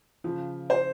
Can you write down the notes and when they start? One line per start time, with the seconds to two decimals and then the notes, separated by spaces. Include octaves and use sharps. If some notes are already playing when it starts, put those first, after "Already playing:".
0.24 C#3 F3
0.70 C5